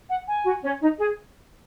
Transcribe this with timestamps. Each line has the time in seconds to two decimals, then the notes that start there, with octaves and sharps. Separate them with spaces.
0.10 F#5
0.28 G#5
0.45 F#4
0.63 C#4
0.82 D#4
1.00 G#4